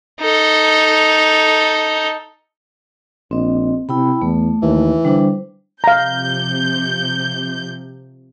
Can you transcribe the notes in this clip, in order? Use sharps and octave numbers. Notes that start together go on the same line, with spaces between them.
D#4 A4
A#1 C4 D#5
C3 E4 G5 B5
E2 A3
D#2 E3
D3 G3 D4 C5
C3 F3 F5 A#5 G6